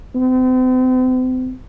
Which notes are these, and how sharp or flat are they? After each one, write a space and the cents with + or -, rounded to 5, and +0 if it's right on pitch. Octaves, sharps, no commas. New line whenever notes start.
C4 -40